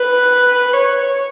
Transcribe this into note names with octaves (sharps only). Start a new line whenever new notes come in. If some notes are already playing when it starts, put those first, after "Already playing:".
Already playing: B4
C#5